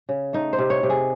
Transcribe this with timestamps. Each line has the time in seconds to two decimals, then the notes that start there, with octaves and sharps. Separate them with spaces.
0.09 C#3
0.33 A3 D#4
0.53 C5
0.59 C3
0.70 C#5
0.83 C3
0.90 G#4